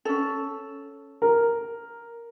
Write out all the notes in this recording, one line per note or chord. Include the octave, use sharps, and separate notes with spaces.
C#4 A4
A#4